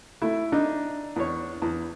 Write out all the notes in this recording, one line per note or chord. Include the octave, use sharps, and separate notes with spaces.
A3 E4
D4 D#4
E2 C#5
E2